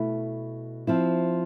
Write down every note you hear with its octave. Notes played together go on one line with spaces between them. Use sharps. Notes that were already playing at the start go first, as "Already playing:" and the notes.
Already playing: B2 A3 E4
F3 C4 E4